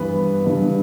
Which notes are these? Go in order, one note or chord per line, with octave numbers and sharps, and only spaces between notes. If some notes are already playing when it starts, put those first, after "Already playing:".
Already playing: G2 E3 B3 B4
G2 E3 B3